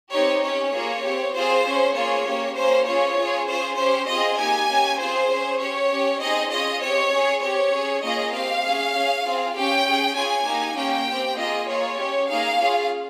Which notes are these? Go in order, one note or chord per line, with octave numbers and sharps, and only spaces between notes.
C4 D#4 G4 C#5
C#4 G4 C#5
A#3 F4 G#4
C4 G4
C4 F4 G#4 C5
C#4 G#4
A#3 F4 G#4 C#5
A#3 C#4 G4
A#3 C#4 G4 C5
C#4 F4 G#4 C#5
C#4 F4 G#4
C#4 F4 G#4 C5
C#4 G4 C5
C4 F4 G#4 D#5
A#3 D#4 G4 G#5
A#3 C#4 G4
C4 F4 G#4 C5
C#4 G#4
C#4 G4 C#5
C#4 G4
C4 D#4 G#4 D#5
C#4 F4 G#4 D#5
C4 G4 C#5
C#4 G#4
C4 G4 C#5
C#4 G#4
A#3 C#4 F4 G#4 D#5
C4 G4 F5
C#4 G#4
C#4 G#4
C4 F4 G#4
C#4 G4 G5
C#4 G#4
C#4 F4 G#4 G#5
A#3 D#4 G4
A#3 C#4 G4 G5
G4
C4
A#3 F4 G#4 D#5
A#3 F4 G#4 C#5
C#4 G4
A#3 D#4 G#4 F5
C#4 F4 G#4